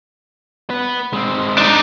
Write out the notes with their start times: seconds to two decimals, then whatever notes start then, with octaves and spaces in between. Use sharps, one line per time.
0.70 B3 B4
1.13 G#3 C4
1.58 D4 D#4